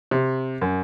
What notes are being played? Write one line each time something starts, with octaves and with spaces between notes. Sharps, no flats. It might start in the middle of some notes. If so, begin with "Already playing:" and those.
C3
F#2